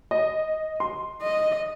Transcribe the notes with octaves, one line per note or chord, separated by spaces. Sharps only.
D#5
C6
D#5